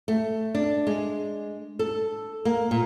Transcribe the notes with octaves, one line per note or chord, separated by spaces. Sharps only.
A3
D4
G#3
A4
A#3
A#2